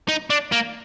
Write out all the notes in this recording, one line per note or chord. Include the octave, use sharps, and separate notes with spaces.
D#4
D4
A#3